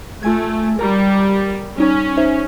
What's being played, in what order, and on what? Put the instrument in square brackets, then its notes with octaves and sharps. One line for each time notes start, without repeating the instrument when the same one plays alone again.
[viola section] A3 [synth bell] F4 G#5 G#6
[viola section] G3 [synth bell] A#4 A#5
[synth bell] G3 D#4 [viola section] C#4
[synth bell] D#4 C5 E5